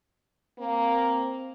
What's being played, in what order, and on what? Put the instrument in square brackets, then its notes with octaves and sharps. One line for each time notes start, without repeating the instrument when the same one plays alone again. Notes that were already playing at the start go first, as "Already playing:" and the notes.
[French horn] A#3 [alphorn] C4